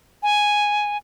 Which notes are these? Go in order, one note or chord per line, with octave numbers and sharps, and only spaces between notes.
G#5